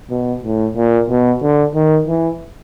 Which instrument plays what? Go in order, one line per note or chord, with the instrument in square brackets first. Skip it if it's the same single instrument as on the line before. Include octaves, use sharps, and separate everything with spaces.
[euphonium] B2
A2
A#2
B2
D3
D#3
E3